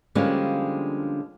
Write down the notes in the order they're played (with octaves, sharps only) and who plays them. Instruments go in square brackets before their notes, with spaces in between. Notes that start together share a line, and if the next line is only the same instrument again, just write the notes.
[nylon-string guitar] D3 F3 G3 G#3 A#3 C#4